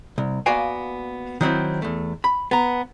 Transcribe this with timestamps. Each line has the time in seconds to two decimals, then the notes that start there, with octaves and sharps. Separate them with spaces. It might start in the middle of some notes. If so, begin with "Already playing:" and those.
0.18 C2
0.46 A#3 B3 F#4 D5 F5 G#5
1.41 D#3 F#3 C4 E4
1.82 E2 A3
2.24 B5
2.51 B3 A#5